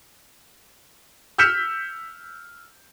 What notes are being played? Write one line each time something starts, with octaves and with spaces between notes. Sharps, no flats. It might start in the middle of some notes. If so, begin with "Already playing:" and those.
E6 F6 G6 B6 C#7 E7